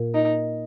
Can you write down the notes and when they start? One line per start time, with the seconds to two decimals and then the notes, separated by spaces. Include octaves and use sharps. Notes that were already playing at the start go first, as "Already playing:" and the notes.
Already playing: A#2 A#3
0.14 D#4